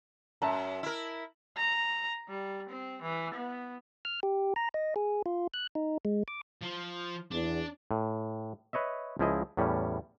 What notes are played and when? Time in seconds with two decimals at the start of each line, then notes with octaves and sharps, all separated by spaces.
0.42 F#2 E5 A5 A#5
0.83 E4 A#4
1.57 A#5
2.29 G3
2.69 C4
3.02 E3
3.34 B3
4.05 F6
4.23 G4
4.56 A#5
4.74 D#5
4.96 G#4
5.26 F4
5.54 F#6
5.75 D#4
6.05 G#3
6.28 D6
6.63 F3
7.31 E2 D4
7.91 A2
8.73 B4 C#5 D#5 E5
9.19 C#2 F3 E4 G#4 D#5
9.57 E2 A2 G3 C#4